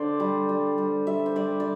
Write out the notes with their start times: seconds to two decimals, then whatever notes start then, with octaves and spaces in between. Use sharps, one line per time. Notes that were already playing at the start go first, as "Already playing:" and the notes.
Already playing: D3 C5 D5
0.20 G3
0.49 G3
0.78 G3
1.07 G3 E5
1.26 C5
1.36 G3 D5
1.60 D5